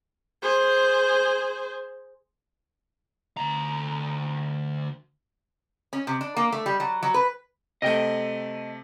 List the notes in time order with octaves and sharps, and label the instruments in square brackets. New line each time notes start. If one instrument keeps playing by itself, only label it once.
[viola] G#4 C5
[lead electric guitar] D2 A#5
[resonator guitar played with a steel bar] C#4
C3
D4
A#3
A3
G3
F#3
F#3
B4
[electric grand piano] C3 A3 [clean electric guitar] D#5 G5